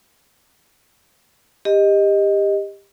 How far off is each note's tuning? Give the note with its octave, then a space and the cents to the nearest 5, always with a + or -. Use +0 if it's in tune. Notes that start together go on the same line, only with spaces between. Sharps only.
G4 +20 D#5 +0